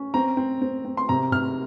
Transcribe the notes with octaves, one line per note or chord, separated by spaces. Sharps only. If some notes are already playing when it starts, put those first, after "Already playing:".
Already playing: C#4
C4 A#5
C4
C4
C4
C6
C3 A#5
C3 F6